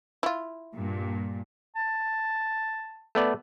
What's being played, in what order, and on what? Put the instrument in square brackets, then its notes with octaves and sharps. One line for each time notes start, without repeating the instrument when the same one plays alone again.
[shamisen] E4 F4
[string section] G2 A#2
[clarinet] A5
[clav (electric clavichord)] A3 B3 D5